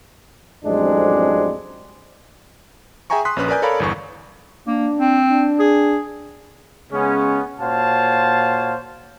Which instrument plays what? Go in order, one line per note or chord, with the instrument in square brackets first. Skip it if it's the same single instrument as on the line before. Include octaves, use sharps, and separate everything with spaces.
[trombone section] A1 F2 F#3 G#3 C4 D4
[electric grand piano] G#4 E5 G5 G#5 A#5 C#6
C6 D#6 F#6 B6
A#1 C#4 B4 F#6
A#4 B4 D5 G#5 G6
A4 A#4 C#5 D5 F5 B5
G1 E2 C#6
[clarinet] A#3 [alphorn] D4
[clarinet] C4
[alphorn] D4
[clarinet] G#4
[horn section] C#3 G#3 B3 C#4
A#2 F#4 C5 C#5 F5 A5